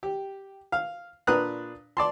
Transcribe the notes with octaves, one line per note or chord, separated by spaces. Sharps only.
G4
F5
A#2 D4 B4 A#5 D#6 F#6
D5 A5 C6